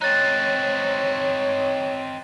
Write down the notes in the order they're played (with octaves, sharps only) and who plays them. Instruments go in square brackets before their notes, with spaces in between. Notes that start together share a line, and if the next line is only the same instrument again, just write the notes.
[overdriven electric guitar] C4 D#4 [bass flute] C#5 [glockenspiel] F#6 A6